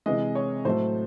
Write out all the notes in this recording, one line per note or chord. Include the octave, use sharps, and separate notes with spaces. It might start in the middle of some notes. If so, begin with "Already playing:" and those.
C3 E3 G#3 D#5
C#5
A2 F#3 A3 C5